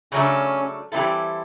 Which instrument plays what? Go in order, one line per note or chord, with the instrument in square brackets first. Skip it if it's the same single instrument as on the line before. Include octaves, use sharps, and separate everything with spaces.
[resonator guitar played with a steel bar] C#3 F#3 A3 D4 [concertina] C#4
[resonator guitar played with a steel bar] E3 G3 C4 E4 A4